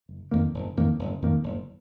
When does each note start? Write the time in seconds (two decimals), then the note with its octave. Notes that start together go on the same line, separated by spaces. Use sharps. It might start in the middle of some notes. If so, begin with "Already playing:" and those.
0.09 F#1
0.31 F2 D#3 A#3
0.54 F#1
0.77 F2 D#3 A#3
0.99 F#1
1.22 F2 D#3 A#3
1.43 F#1